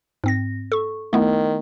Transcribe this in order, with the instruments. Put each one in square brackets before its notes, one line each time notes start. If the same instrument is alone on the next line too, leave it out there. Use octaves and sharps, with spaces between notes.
[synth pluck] G#2 C4 A#6
A4 C#6
[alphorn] D#3 [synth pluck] A3 B3 E4